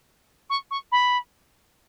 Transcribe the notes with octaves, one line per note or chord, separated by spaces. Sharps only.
C#6
C#6
B5